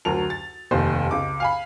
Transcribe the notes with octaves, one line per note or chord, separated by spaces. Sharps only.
D2 F#3 A#4 A5 F7
A6
F1 D#2 C5
C#2 D6
F5 G#5 B5